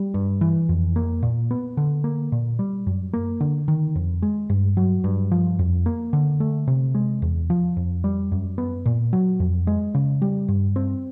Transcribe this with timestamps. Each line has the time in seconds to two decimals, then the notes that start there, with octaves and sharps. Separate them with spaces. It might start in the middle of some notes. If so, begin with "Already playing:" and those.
Already playing: G3
0.14 G2
0.41 E3
0.69 F2
0.96 A#3
1.23 A#2
1.51 B3
1.77 D3
2.04 A#3
2.32 A#2
2.59 G3
2.87 F#2
3.13 A#3
3.40 D3
3.68 D#3
3.96 F2
4.22 G#3
4.50 G2
4.77 F#3
5.04 G2
5.32 F3
5.59 F2
5.86 A#3
6.13 D3
6.40 A3
6.67 C3
6.95 G#3
7.22 E2
7.50 F3
7.77 F2
8.04 G3
8.32 F#2
8.58 B3
8.86 A#2
9.13 F#3
9.40 F2
9.67 G#3
9.95 C#3
10.22 G3
10.48 G2
10.76 C4